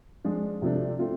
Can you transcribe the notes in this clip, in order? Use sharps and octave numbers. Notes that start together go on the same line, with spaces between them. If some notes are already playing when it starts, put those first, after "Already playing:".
F3 G#3 D4 F4
C3 F3 A3 D4
A3 C4 F4